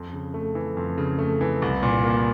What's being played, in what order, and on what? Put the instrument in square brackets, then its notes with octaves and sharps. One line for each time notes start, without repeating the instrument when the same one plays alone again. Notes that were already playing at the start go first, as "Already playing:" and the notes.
Already playing: [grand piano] F2
C#3
A3
E3
F2
C#3
A3
E3
C2
A#2
A#3